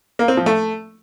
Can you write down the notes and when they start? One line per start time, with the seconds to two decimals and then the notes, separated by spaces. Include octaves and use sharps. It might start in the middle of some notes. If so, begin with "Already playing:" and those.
0.19 A#3
0.28 C4
0.37 F3
0.46 A3